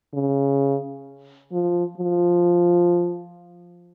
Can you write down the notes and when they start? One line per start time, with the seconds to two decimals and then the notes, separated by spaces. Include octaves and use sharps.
0.14 C#3
1.52 F3
1.98 F3